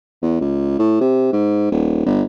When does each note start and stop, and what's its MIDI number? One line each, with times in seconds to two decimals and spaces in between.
0.22 0.40 40
0.41 0.76 37
0.79 1.00 45
1.01 1.28 48
1.33 1.68 44
1.71 2.03 27
2.06 2.22 31